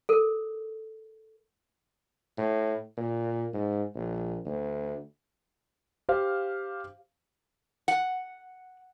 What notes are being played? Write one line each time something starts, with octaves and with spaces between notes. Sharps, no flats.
A4 A#4
A2
A#2
G#2
A#1
D2
G4 C5 F5
F#5